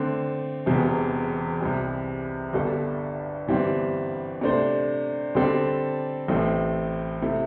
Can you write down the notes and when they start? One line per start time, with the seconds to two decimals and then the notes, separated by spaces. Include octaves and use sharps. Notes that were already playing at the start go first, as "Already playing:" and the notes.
Already playing: D3 A3 C4
0.66 E1 E2 C3
1.60 C2 C3 G3
2.53 G1 G2 G3 D4 A4
3.48 G1 G2 E3 G3 C4
4.41 C3 A3 D4 C5
5.35 D3 G3 C4 A4
6.28 A1 A2 A3 C4
7.22 C3 A3 E4